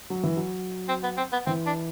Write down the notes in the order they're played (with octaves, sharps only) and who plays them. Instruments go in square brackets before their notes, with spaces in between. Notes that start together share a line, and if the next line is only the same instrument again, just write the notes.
[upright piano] F#3
E3
F#3
[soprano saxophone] C4
B3
C4
B3
[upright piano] E3 [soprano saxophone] C4
[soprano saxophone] D4